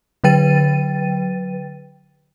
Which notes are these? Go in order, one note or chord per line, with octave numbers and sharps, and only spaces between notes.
D3 F#3 B4 G5 A6 D#7